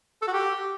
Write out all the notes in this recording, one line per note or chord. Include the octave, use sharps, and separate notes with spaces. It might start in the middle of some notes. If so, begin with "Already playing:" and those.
A4
F#4
G4